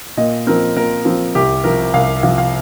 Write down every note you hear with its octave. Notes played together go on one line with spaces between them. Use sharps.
A#2 D#5
F3 C4 A#4
A#2 A#4
F3 C4
C2 G4
C3 F3 A#4
C2 F5
C3 F3 F5
F5